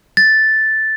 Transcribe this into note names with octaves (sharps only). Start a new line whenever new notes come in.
A6